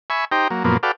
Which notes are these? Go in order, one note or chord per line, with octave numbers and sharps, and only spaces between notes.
E5 G#5 B5 C#6
D#4 G4 C5 G5 A#5
F#3 A#3
F#2 A#2 F3 A#3 B3
F#4 A4 B4 D5 F5 G5